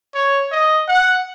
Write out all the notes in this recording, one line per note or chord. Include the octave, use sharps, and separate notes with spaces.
C#5
D#5
F#5